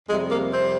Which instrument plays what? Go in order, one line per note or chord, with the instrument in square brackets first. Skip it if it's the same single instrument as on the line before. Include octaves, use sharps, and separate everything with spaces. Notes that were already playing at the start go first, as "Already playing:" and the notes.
[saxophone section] F2 C3 G3 G#3
A#3
C4